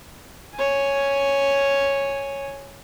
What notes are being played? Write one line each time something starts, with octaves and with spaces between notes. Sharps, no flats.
C#5 G#5